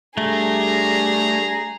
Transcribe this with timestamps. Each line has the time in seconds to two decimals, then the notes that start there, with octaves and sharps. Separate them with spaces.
0.18 G3 A3 D4 G#4 A#5